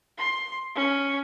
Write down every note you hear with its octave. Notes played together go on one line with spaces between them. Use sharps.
C6
C#4